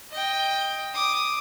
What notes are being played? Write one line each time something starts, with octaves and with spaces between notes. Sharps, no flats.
D#5 G5
D6 D#6